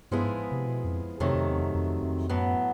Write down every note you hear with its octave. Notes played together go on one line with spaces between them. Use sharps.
G2 F3 G#3 B3 E4 G#4
G#2
C3
B2
F2
F2 C3 D#3 F#3 A3
F2
E2
F2
F2
F2
F#2 A2 F#3 B3